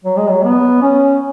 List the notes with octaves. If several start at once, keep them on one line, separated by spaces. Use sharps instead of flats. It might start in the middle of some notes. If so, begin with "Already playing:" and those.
F#3
G#3
F#3
B3
C#4